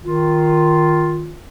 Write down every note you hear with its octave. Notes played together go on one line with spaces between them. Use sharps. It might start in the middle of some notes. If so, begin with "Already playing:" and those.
D#3 F4